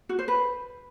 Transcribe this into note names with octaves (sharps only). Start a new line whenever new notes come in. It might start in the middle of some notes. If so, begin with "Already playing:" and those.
F#4
C5
B4